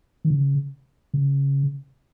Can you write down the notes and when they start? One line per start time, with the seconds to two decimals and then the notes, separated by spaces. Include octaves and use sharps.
0.25 D#3
0.30 C#3
1.14 C#3